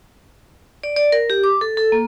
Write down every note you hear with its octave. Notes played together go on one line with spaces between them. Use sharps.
D5
D5
A#4
G4
D6
A4
A4
A#3